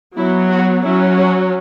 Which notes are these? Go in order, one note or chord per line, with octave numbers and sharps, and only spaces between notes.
F#3 B3 E4
F#4
F#3 C#4 E4
F#4